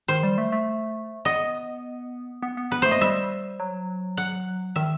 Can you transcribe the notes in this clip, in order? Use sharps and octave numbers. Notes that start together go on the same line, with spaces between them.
D#3 C5
G3
A3
A3
B3 D#5
B3
B3
B3 B4
A3 C5
D#5
G3 E5
F#3
F#5
D#3 E5